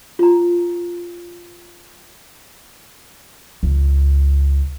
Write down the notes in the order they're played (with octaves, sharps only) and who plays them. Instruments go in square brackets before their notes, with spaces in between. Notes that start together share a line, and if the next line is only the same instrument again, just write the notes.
[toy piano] F4 A#5
[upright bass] C#2